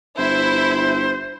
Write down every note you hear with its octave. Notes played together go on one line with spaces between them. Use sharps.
G1 E4 C5